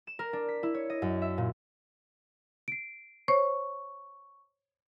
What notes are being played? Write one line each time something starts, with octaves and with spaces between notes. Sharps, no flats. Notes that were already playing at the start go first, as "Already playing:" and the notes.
E7
A#4
D4
B6
E4
C#5
D#5
F#2
E5
A#2
C7 D7
C5 C#5 C#6